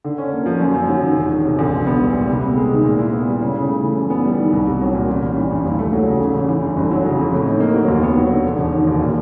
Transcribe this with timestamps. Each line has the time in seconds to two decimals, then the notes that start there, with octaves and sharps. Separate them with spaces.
0.04 D3
0.18 C#4
0.32 A#3
0.46 F3
0.61 F#2
0.74 F#2
0.88 F#3
1.02 D#3
1.16 E1
1.31 D#3
1.45 C3
1.59 D2
1.73 A#1
1.87 B3
2.01 G3
2.14 A#2
2.29 C3
2.43 B3
2.56 G#3
2.71 D#3
2.84 A#2
2.99 E4
3.12 B3
3.27 G3
3.41 C#3
3.55 C#3
3.69 A3
3.83 E3
3.97 F#2
4.10 B3
4.25 G3
4.39 D#3
4.53 C2
4.67 C2
4.81 F#3
4.95 A#2
5.09 A1
5.23 G3
5.37 E3
5.51 G2
5.65 D#2
5.79 A3
5.93 F#3
6.07 C#3
6.20 A1
6.35 A1
6.49 E3
6.63 G2
6.77 G1
6.91 F#3
7.05 C#3
7.19 F2
7.33 A2
7.47 D#4
7.60 A#3
7.74 F#3
7.88 D#2
8.03 B3
8.17 F#3
8.31 D3
8.45 E1
8.59 E1
8.72 D#3
8.87 D#2
9.01 A#2